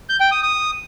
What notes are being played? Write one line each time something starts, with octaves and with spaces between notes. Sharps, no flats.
G6
G5
D#6
D#6